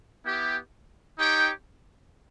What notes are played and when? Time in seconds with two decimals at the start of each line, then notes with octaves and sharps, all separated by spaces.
0.24 B3 E4 G4
1.19 D#4 G4 C#5 G5